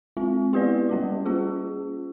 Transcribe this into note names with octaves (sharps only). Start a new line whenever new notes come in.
G#3 C4 F4
B3 E4 G4 B4 D5
G3 A#3 C#4 F#4
A#3 C#4 F4 G#4